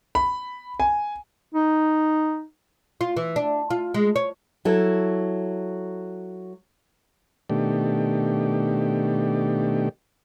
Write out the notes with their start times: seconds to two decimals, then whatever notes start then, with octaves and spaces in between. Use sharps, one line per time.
0.15 B5
0.80 G#5
1.55 D#4
3.01 F4
3.17 E3
3.36 D4
3.70 F4
3.94 G#3
4.16 C#5
4.65 F#3 E4 A4
7.50 B2 D#3 A3 D4 G4